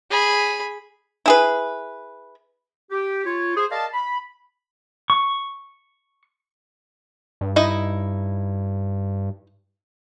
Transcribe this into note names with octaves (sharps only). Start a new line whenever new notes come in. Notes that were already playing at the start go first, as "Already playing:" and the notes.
G#4 B5
E4 G#4 B4
G4
F4 C#5
G#4 C5
A#4 D5 D#5 F5 A5
B5
C#6
G2
D#4 E4 D#5